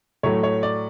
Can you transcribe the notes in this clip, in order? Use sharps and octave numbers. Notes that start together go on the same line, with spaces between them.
A2 F#3 A3 C#5
C#5
D5